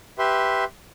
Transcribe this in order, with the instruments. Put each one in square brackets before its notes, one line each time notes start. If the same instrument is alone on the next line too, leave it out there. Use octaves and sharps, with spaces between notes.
[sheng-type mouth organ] G4 B4 E5 C6